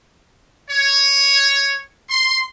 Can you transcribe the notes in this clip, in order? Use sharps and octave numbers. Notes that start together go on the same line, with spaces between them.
C#5
C6